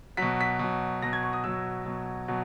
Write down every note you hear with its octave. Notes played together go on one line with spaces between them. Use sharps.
B2 F#3 B6
B6
B2 F#3
B2 F#3 A#6
G#6
C#6
D#6
B2 F#3 E6
B2 F#3
B2 F#3